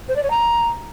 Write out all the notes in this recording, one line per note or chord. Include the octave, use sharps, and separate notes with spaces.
C5
D5
C#5
A#5